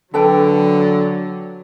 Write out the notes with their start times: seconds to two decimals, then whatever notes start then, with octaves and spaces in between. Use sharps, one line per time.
0.14 D3 F#3 A4 B4 G5